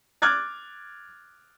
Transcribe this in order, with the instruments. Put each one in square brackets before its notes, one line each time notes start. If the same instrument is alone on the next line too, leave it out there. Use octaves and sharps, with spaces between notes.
[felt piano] D6 F6 F#6 G#6 A6